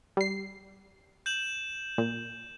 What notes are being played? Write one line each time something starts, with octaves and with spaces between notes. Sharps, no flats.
G3 C7
G6 E7 F#7
A#2